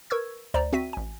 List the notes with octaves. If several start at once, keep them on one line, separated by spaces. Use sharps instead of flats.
A#4 B4 C#6 E6 G#6
D2 C5 D5 A#5
C4 F#4 E5 B6 D#7
A1 G#5